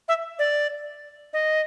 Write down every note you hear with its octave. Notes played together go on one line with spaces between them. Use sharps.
E5
D5
D#5